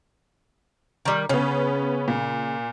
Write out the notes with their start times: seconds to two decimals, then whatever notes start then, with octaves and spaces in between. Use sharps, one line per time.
1.05 D#3 G3
1.29 C#3 B3 C#4
2.08 A#2